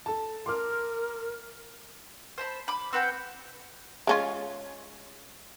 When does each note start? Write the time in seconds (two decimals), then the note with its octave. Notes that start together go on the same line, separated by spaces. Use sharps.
0.06 A4 A5
0.46 A#4 C6 D6 F6
2.38 C5 A5 B5
2.68 B5 D6
2.93 C4 B4 F#5 G5
4.07 G#3 C#4 F4